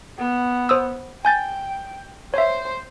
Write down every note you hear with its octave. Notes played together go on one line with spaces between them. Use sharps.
B3
C5 D#6 E6
G5 G#5 G6 A6
C5 C#5 E5